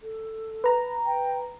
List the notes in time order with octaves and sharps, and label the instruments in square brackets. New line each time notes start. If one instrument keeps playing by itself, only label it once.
[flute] A4
[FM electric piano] B4 A#5
[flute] G5